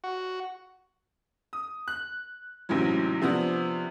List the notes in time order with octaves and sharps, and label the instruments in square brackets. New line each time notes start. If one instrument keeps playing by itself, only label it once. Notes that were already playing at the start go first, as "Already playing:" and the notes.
[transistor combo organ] F#4
[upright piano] D#6
F#6
A1 G#2 C3 E3 F#3
C3 F3 B3 D4